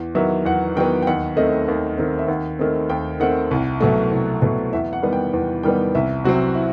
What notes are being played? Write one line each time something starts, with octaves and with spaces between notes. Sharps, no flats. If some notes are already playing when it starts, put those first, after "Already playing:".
Already playing: E2
D#3 F#3 B3 E5
E2 F#5
D#3 F#3 B3 G5
G5
D#2 F#5
D#3 A3 C4 D#5
D#2
D#3 A3 C4
E5
D#2 F#5
D#3 A3 C4
D#2 G5
D#3 A3 C4 F#5
C2
B2 F#3 A3
C2
B2 F#3 A3
E2 E5
F#5
D#3 G3 B3
G5
E2
D#3 G3 B3 G5
C2 E5
C3 F#3 C4 F#4
E4